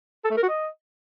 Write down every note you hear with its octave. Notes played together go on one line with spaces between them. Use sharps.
A4
A3
A#4
F#4
D#5